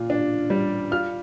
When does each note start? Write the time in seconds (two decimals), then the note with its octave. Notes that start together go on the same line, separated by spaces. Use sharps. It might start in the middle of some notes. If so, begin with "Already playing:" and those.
Already playing: A#2 F4
0.10 D4
0.50 G3
0.92 F4 F6